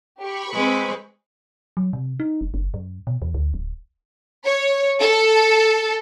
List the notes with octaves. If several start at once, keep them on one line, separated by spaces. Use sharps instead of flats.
G4 B5 C#6
G#3 C4 B4
F#3
C3
D#4
F1
F#1
F#2
B2
E2
D2
D1
C#5
A4